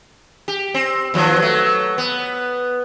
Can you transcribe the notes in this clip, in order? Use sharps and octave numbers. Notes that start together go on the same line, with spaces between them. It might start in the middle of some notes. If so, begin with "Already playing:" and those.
G4
C4
D#2 F3 F#3
F#3 A3
B3